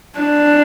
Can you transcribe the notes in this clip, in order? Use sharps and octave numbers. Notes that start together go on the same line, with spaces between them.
D4